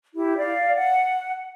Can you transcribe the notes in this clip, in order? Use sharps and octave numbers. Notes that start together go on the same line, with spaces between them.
E4 G4
D5 F5
F#5